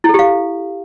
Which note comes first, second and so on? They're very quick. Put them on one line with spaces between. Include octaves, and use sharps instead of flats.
E4 A4 G4 F5